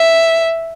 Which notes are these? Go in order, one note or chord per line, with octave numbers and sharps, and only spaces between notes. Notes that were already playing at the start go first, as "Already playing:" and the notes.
Already playing: E5